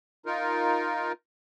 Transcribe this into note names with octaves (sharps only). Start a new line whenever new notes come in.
D#4 F4 A#4